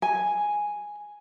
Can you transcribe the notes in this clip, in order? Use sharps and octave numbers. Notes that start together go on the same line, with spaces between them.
G#5